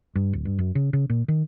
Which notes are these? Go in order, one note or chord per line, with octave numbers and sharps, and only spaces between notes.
G2
D1
G2
F#2
C#3
C#3
A#2
D#3